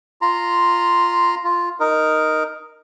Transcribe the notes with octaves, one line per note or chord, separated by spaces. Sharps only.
F4 A#5 C6
F4
D#4 A#4